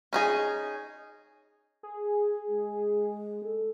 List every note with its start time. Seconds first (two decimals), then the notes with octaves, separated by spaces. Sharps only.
0.13 C#4 D#4 G#4
1.83 G#4
2.48 G#3
3.44 A4